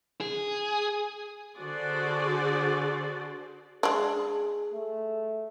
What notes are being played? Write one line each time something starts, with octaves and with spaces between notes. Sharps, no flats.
G#4
D3 F#4 G#4 C5 D5
G#3 D4 G#4
A3